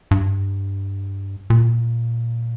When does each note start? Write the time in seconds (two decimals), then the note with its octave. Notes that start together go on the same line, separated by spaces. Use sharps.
0.11 G2
1.50 A#2